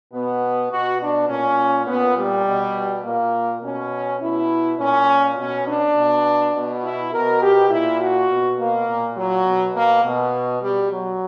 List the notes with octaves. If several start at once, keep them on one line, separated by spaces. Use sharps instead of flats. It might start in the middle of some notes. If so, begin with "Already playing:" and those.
B2 B3
B2 F#4
D4
A#2 C#4
A#2 B3
G3
B2
A#2 A#3
B2 C#4
B2 E4
A#2 C#4
B2 C#4
D4
B2
B2
E4
B2 A#4
G4
A#2 E4
F#4
B2
A#3
A#2
F#3
B2
A#3
B2
B2 G3
F#3